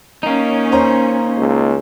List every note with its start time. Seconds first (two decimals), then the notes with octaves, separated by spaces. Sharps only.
0.23 A#3 C#4 D#4
0.72 C5 C#5 A#5
1.38 C#2